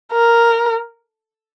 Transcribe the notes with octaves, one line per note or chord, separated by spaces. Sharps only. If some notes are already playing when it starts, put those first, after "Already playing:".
A#4